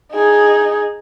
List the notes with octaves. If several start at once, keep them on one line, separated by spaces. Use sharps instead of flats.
D#4 G#4